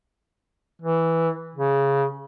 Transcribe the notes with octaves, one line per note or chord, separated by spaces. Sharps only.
E3
C#3